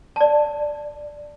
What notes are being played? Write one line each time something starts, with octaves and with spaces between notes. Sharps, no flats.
D5 A5